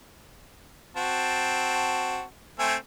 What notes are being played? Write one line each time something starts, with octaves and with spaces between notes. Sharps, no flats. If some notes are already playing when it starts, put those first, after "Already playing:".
C4 F#4 A5
A3 C4 G#5